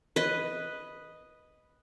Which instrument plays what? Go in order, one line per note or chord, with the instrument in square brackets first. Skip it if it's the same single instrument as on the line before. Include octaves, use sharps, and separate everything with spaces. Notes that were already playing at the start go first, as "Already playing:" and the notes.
[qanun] B4 D#5